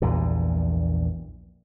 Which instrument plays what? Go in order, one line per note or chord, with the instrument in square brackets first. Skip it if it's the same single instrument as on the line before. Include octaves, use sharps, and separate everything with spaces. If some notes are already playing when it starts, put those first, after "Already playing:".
[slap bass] A#1 E2 G2 A#2